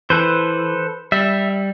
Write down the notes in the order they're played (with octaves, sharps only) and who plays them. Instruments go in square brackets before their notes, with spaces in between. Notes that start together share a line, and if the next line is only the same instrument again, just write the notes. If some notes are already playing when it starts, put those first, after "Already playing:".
[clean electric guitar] E3 [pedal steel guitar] A4 B4 C5
[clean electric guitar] G3 [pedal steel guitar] E5